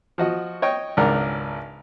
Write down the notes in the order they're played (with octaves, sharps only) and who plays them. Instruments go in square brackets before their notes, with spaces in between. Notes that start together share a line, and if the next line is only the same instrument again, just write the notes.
[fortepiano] F3 F#4 D#5
C#5 D#5 G5
G#1 C#2 D4 A#4 F#5